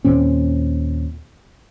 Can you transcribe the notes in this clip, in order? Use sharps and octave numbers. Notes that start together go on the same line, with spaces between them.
D#2 A#2 C4 C#4